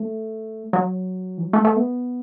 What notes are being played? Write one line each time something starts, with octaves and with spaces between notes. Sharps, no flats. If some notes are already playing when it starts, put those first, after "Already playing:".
Already playing: A3
F#3
E3
F#3
A3
A3
B3